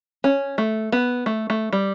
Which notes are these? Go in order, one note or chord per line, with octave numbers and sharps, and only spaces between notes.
C#4
A3
B3
A3
A3
G3